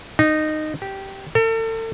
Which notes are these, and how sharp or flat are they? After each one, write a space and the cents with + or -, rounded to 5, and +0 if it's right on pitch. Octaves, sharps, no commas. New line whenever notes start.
D#4 -15
G4 -10
A4 +40